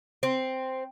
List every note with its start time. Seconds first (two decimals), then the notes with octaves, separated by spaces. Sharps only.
0.23 C4